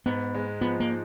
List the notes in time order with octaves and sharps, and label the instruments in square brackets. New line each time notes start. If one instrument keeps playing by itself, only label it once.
[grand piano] G#2 [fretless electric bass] B3
[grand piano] G#3
[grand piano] F3 [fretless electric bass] B3
[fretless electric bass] A#3
[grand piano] D#4